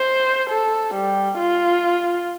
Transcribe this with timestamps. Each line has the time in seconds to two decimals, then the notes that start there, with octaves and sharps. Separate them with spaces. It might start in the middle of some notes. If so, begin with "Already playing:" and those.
Already playing: C5
0.51 A4
0.95 G3
1.39 F4